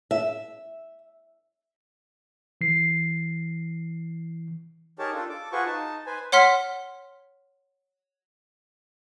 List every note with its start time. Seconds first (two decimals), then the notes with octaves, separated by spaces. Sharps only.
0.11 E5
2.61 E3 C7
4.99 D#4 G4 G#4 A#4 C#5 A5
5.14 D4 F4 A4
5.29 A4 D6
5.52 F4 F#4 G#4 B4 C5 C#6
5.66 D#4 A5
6.06 B4 C5 G#5
6.32 C#5 F#5 C6 F6 B6